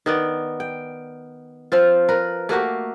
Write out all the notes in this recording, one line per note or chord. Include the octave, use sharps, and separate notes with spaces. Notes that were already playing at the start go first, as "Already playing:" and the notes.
D#3 B3 D5
G5
F3 C4 F4
A#4 B4
A3 A#3 F#4 G4